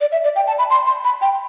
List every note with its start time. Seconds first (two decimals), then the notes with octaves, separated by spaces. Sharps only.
0.01 D5
0.12 E5
0.24 D5
0.36 G5
0.47 A5
0.58 B5
0.70 C6
0.87 C6
1.05 B5
1.22 G5